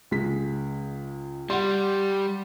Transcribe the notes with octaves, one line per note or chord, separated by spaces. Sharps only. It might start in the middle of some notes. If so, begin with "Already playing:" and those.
C#2 G#3 B6
G3 F#5 C6